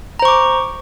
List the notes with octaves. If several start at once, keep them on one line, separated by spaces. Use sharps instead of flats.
C5 A#5 C#6 D6